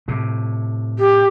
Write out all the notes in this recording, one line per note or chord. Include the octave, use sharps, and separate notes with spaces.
A2 C3
G4